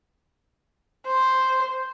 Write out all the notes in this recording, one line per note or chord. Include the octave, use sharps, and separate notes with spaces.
C5